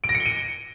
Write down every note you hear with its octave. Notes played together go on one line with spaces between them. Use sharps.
D7
A#6
C#7
G7
D#7